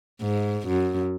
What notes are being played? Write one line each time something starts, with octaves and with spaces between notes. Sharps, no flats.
G#2
F#2